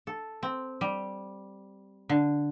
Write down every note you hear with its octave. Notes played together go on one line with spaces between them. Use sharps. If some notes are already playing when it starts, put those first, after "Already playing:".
A4
C4
G3
D3